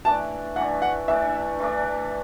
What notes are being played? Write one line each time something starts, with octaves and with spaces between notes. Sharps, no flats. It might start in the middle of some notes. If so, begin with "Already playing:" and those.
E3 A3 D4 A5
E3 A3 D4 F#5
F#5
E3 A3 D4 E5
E3 A3 D4